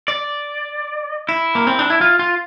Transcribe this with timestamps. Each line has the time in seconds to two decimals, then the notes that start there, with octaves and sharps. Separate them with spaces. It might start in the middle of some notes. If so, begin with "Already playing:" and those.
0.08 D5
1.29 E4
1.55 A#3
1.67 C4
1.79 D4
1.90 E4
2.01 F4
2.19 F4